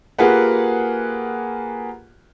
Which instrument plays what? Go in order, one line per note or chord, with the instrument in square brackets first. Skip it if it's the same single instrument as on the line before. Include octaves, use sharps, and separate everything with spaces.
[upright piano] A#3 F4 G4 G#4 B4 F#5